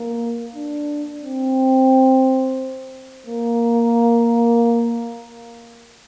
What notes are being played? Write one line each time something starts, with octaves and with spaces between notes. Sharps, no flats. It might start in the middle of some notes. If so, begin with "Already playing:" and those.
Already playing: A#3
D4
C4
A#3